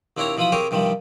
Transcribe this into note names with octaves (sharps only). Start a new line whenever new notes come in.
D#2 C4 D4 E4 C#5 A#5
B2 E3 F3 F4 B5 D#6
C4 G4 G#4 A#4 C#5 G#5
G2 C3 D#3 F3 G3